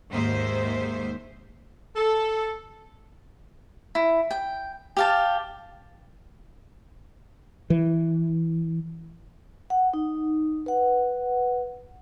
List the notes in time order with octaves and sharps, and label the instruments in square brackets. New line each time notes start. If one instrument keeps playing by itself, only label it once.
[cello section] D#2 G#2 D#3 G#3 C5 E5
[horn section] A4
[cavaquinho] E4
G5
G4 F5 A5
[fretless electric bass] E3
[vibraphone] F#5
D#4
B4 F#5